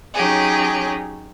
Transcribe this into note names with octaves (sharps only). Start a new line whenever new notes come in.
F#3 C#4 D#4 G4 G#4